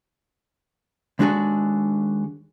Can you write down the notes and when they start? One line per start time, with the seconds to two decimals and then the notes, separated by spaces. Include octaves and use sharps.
1.19 D#2 G#3 D4 F#4 G#4 A4